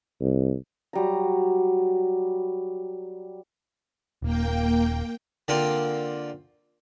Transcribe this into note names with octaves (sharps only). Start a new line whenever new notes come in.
C2
F#3 G3 A#5
D#1 A#3 G5
D3 A#3 C4 F4